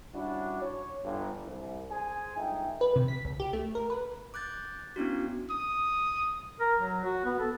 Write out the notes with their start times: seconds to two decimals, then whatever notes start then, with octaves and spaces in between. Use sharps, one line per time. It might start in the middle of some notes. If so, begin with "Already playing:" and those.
0.14 G3 C#4 D4 E4 F#4
0.62 C#5
1.03 G1
1.44 C2
1.92 G#4 C5 G#5
2.36 G1 G#3 D#4 E5 G5
2.81 B4
2.96 C3
3.08 B6
3.25 C#2
3.40 G4
3.53 A3
3.75 A#4
3.90 B4
4.34 D6 F#6 G6 A6
4.96 B3 C#4 D4 E4 F#4
5.50 D#6
6.60 A#4
6.79 F#3
7.04 F#4
7.25 B3
7.39 A4